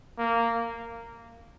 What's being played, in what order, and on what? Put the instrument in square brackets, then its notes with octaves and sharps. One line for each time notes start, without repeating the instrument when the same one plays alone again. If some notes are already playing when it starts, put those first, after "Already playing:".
[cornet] A#3